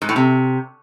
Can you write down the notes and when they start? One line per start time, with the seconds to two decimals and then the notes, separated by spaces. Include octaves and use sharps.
0.02 G#2
0.09 A2
0.16 C3